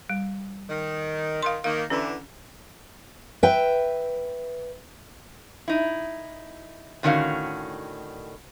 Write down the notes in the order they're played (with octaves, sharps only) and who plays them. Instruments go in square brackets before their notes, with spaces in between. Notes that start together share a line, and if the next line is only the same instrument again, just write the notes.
[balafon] G3
[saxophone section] D#3
[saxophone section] D#3 [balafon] F5 C6
[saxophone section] D#3 A#3 [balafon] F5
[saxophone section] D3 E3 [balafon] C#4
[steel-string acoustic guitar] B4 E5 G5
[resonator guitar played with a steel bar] D#4 E4
A2 D3 D#3 C#4 F#4 F5